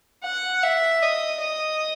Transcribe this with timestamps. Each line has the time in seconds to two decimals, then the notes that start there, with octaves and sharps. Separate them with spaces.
0.24 F#5
0.63 E5
1.02 D#5
1.40 D#5